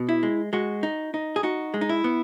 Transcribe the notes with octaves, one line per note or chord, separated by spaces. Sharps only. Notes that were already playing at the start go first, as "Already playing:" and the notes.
Already playing: B2
E4
G#3
G#3 F#4
D#4
D#4
G#4
D#4 F#4
G#3
D#4
E4
B3